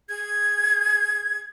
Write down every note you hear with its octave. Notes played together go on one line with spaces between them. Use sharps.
G#4 G#6